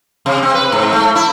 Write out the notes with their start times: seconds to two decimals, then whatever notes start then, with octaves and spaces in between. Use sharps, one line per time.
0.26 C3
0.43 C4
0.54 B4
0.72 G#2
0.93 A3
1.15 E4